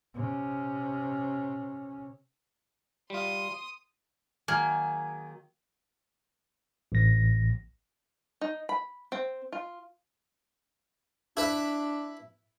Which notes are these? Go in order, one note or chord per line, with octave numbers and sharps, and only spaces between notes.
C3 C#4
G3 F4 C6 D#6
D#3 F#3 A#3 G#4
A1 A#6
D#4
B5
C4
F4
D4 E4 B4 E5